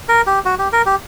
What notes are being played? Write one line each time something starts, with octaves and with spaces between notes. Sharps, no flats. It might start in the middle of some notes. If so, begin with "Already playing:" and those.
A#4
G4
F#4
G4
A#4
G4